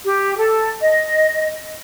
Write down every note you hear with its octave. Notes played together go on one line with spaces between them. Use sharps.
G4
A4
D#5